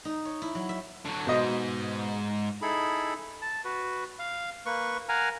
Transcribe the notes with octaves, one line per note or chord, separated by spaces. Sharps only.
D#4
C#5
E4
F#3
E5
D3 F#3
G#2 B2 D#5
D#4 E4 G#4 A4 B5
A5
F#4 B4
F5
A#3 B4 C#6
A#4 F5 F#5 G#5 A#5